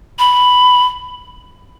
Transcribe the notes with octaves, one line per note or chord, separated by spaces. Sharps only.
B5